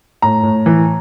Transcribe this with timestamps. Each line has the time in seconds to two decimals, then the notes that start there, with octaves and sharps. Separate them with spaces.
0.22 A2 A#5
0.43 A2
0.66 E3